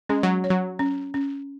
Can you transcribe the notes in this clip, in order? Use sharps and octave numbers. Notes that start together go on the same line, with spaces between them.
G#3 C#4
F#3
C#5
F#3
C#4
C#4